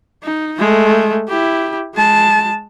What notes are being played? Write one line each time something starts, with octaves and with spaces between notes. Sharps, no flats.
D#4
G#3 A3
E4 G4
G#3 A5